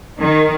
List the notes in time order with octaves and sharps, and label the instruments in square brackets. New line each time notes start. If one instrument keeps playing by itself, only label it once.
[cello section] D#3